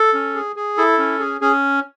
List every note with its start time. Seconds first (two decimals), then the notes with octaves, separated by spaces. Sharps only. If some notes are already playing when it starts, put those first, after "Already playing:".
Already playing: A4
0.14 C#4
0.35 G#4
0.56 G#4
0.77 E4 A4
0.98 C#4
1.20 G#4
1.41 C#4 G#4